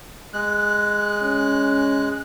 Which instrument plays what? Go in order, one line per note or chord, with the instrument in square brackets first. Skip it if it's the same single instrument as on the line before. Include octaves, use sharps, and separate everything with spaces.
[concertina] G#3 F#6
[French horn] C#4